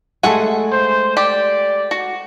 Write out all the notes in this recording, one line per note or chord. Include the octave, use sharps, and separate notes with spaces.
G#3 A3 E5 F#5 G#5
C5
G4 D5
F#4